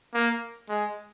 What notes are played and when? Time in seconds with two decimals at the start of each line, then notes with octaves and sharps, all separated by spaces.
0.14 A#3
0.69 G#3